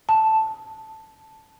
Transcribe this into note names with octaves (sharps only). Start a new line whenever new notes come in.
A5